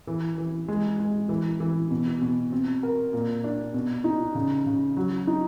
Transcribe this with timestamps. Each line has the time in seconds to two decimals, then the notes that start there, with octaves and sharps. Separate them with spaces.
0.07 E3
0.38 E3
0.68 G#3
0.99 G#3
1.29 E3
1.60 E3
1.91 B2
2.21 B2
2.52 C4
2.83 A#4
3.13 A#2
3.44 D4
3.74 B2
4.04 D#4
4.35 C#3
4.66 C#3
4.97 F#3
5.27 D#4